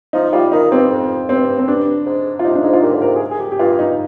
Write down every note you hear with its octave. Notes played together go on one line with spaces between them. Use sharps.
F3 D#4
G3 F4
D#3 D#4
G2 C4
F2
G2 C4
C4
G2 D4
G#2
F4
C3 D#4
D4
G#2 D#4
F4
A#2 G4
D3
C3 A#4
G#4
A#4
G#4
G4
G4
G2 F4
D#4